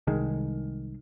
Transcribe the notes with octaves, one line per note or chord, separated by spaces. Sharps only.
C2 D#3 G#3